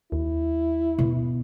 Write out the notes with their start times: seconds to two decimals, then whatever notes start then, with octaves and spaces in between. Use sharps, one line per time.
0.12 D#2 E4
0.99 B2